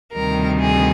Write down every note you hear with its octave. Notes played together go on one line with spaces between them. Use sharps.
D2 C3 D#3 G3 A#4
G#4